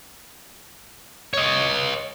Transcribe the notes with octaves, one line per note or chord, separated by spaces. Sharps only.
C#5 D#5